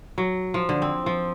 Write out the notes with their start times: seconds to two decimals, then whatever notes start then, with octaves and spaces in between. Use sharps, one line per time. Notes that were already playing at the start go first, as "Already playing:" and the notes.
0.18 F#3
0.54 F3
0.69 D3
0.82 C4
1.06 F3